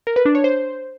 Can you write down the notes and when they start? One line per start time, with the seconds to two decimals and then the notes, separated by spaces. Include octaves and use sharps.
0.07 A#4
0.16 B4
0.25 D4
0.35 C#5
0.44 C5